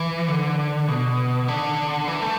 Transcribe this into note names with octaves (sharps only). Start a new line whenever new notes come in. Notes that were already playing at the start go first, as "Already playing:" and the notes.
Already playing: E3
D3
B2
D3
E3
A3